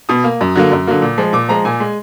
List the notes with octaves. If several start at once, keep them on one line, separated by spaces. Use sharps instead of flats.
B2 D#6
A#3
F#2
D3 F#3 A#3
F#2
D3 F#3 A#3
A#2
F3 G#3
A#2 D6
F3 G#3 A#5
A#2 G#5
G#3